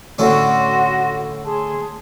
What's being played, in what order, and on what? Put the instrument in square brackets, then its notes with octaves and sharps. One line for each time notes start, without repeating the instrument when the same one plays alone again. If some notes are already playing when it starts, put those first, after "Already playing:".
[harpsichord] A2 D3 C#4 [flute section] F#4 C6
[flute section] G#4 A5 C6